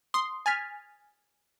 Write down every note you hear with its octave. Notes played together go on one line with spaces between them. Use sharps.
C6 D#6
G#5 F6 A6 B6